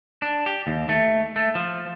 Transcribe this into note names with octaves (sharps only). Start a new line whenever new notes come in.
D4
G4
D#2
A3
A3
F3